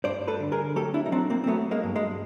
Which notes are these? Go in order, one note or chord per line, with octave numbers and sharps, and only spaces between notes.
G2 C5 D5
A4 B4
D3
G#4 A#4
F#3 G4 A4
D4 E4
D#4
F#3 C4 D4
A#3 C4
C4
F#3 A3 B3
G#3 A#3
G2
G#3